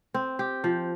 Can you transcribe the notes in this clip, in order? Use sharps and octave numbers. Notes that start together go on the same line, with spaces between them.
C4
G4
F3